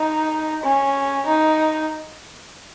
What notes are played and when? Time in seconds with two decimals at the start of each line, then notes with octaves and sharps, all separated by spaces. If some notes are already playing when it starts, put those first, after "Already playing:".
Already playing: D#4
0.63 C#4
1.27 D#4